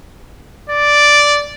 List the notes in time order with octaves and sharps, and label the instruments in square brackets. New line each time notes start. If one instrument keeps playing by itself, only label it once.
[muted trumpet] D5